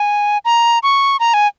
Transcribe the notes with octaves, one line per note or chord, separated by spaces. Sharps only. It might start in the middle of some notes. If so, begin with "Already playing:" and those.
Already playing: G#5
A#5
C#6
A#5
G#5